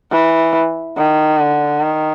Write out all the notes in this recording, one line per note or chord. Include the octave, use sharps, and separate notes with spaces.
E3
D#3
D3
D#3